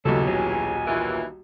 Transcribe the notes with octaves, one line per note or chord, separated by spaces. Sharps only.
D#1 B1 C#3 E3 C#4 A4
F#4 G#4 C#5 G#5
D#2 E3 F4 A#4